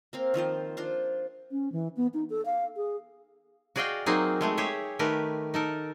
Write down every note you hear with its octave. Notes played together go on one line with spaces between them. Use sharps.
A#3 C4 F5
D#3 F3 F4 C5
D4 F4 C5
C#4
E3
B3
D#4
A4
F5
G#4
F#4 G#4 D5 D#5 F5 G5
F#3 A#3 C4 D#4 G#4
G#3 A3 G#4
G4 G#4 C#5 E5
D#3 A3 G4 A#4 B4
D#4 A4 A#4